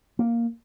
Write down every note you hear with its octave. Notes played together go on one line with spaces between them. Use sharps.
A#3